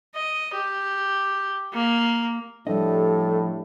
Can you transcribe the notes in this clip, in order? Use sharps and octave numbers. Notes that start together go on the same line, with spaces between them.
D#5
G4
A#3
A2 F3 G3 D4 A4 D#5